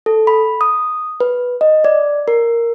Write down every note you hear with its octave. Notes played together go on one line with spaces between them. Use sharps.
A4
B5
D#6
B4
D#5
D5
A#4